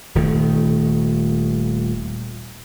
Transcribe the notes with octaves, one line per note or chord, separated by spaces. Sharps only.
D#1 D#3 A3